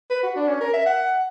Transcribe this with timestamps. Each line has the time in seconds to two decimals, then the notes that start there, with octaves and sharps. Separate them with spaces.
0.10 B4
0.23 F#4
0.36 D4
0.48 C#4
0.60 A#4
0.73 E5
0.86 F#5